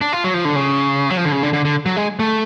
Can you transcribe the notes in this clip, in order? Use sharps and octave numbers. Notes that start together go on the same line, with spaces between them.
D4
F4
F#3
F3
D3
C#3
F#3
F3
D3
C#3
D3
D3
D3
F#3
G#3
A3